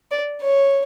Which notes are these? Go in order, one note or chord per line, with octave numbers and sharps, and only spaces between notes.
D5
C#5